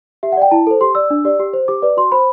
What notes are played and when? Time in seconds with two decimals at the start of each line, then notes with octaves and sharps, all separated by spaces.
0.23 G4 E5
0.32 F#5
0.37 D5 G5
0.51 E4 A5
0.67 A4 C5
0.81 G4 C6
0.95 D5 E6
1.10 D4
1.25 G4 D5
1.40 G4
1.53 C5
1.68 G4 D6
1.82 B4 D5
1.97 F#4 C6
2.12 C5 B5